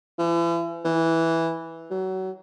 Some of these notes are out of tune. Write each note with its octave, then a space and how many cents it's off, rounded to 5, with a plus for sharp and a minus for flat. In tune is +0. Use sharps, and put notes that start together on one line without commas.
E3 +40
E3 -5
F#3 +25